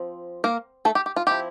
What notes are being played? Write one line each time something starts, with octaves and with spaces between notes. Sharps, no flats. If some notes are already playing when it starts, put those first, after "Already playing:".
Already playing: F3 C4
A#3 A#4
A3 A4
G4
G4
F4
F3 C4 E4 G4